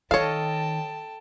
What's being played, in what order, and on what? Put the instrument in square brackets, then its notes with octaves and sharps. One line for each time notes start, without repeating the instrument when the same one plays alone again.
[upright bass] D#3 [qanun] A4 D#5 [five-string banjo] C#5 F5 [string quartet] G5 A5